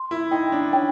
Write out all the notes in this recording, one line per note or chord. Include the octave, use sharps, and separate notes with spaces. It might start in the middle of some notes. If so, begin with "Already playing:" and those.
Already playing: C6
E4
D#4 G5
D4
C#4 G5